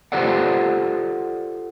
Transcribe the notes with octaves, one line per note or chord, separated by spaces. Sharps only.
F4 G4 A4 C5 D5 F#5